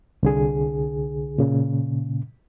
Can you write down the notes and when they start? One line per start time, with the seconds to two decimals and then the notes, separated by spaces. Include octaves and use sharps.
0.23 C2 D3 G#4
1.38 A#2 C#3